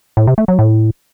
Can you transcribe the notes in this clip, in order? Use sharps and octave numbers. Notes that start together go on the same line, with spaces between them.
A2
C3
A3
F#3
A2